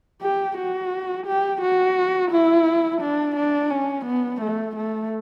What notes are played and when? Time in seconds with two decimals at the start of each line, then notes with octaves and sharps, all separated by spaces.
0.22 G4
0.57 F#4
1.26 G4
1.62 F#4
2.31 E4
3.01 D4
3.36 D4
3.71 C#4
4.06 B3
4.41 A3
4.76 A3